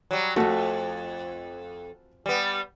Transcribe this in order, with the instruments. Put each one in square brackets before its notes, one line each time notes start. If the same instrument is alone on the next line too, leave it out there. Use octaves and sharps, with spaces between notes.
[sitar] F#3 G3
[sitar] F2 G#2 [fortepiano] A3 F#4
[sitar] G3 B3